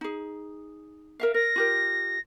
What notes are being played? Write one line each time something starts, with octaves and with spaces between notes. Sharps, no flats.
D#4 G#4
A#4 E5 F5
A#4 A#6
F4 G4 A#4